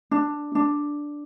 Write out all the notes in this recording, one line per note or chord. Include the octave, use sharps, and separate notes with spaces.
D4
D4